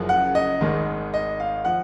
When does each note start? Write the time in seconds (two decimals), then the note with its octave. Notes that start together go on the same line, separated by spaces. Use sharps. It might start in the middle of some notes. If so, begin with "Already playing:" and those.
Already playing: F#1 F#2 C#3 F3
0.09 F#5
0.35 D#5
0.61 G#1 G#2 D#3
1.14 D#5
1.40 F5
1.65 F3 F#5